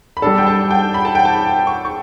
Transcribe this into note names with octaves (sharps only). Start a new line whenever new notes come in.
B5
G3 D4 A4 A5
G5
A5
G5
B5
A5
G5
A5
C#6
C#6